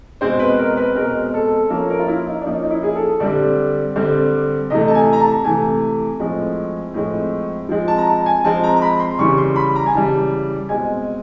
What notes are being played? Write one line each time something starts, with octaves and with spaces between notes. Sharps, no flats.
B2 G#3 C4 C5
B4
A#4
B4
B2 G#3 C4 A#4
A4
F3 A#3 C#4 A4
A#4
F4
E4
D#4
D4
F3 A#3 C#4 D#4
D#4
E4
G#4
A4
D3 G3 C4 D5
D3 G3 C4
C3 E3 A3 D#5
A5
G#5
A#5
A5
C3 E3 A3 G#5
A2 F3 G#3 C4
A2 F3 G#3 C4
F3 G#3 C4
A5
A#5
A5
G#5
F3 G#3 C4 A5
A#5
A#5
B5
C6
C#3 E3 G3 C#6
C6
B5
A#5
G#5
C#3 E3 G3 A5
B2 G#3 C4 G#5